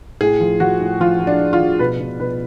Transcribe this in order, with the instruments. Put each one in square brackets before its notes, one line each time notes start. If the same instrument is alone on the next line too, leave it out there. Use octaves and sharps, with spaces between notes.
[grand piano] A2 G#4
F3
F3 F#4
A2
F3 F4
F3
D4
A2
F4
F3
B2 B4
B2
B2 B4